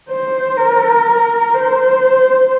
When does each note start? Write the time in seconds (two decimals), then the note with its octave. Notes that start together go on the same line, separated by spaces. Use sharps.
0.10 C5
0.58 A#4
1.55 C5